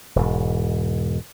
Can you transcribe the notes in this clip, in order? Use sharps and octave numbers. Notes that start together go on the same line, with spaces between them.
E1 G#2